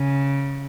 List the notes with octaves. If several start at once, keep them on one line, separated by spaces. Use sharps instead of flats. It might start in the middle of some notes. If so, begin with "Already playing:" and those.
Already playing: C#3